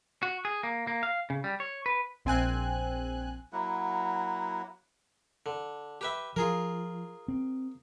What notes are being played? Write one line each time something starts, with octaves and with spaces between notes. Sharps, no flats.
F#4
G#4
A#3
A#3
F5
C#3
G3
C#5
B4
A#1 C4 G#5 F#6
F#3 A#3 E4 F#5
D3
G4 B4 E5
F3 F4 G#4 A#4
C4